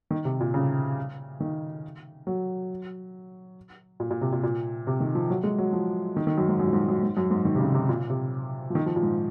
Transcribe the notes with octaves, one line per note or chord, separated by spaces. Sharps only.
D#3
C3
A#2
C#3
D#3
F#3
A#2
A#2
C3
A#2
A#2
C3
D#3
F3
F#3
G#3
F#3
F3
D#3
D#3
F#2
G#2
F#2
A#2
G#2
F#2
G#2
F#2
G#2
D#3
C3
C#3
C3
A#2
C3
F3
D#3
F3
A#2
G#2